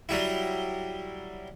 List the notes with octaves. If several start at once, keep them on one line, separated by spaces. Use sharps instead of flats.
F#3 G3 E4